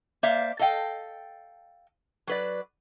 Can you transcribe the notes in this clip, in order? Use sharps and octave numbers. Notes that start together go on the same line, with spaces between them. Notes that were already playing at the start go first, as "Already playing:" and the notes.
A#3 C5 D5 E5 F5
A4 D#5 F5 G5
F#3 B4 D5